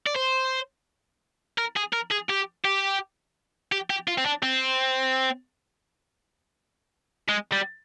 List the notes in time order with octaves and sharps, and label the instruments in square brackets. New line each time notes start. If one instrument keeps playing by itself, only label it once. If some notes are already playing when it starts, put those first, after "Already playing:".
[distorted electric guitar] D5
C5
A#4
G#4
A#4
G#4
G4
G4
G4
G4
F4
C4
D4
C4
G#3
G3